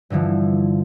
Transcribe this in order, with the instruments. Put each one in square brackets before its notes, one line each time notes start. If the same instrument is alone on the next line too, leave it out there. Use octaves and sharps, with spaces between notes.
[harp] G2 D3 E3 F3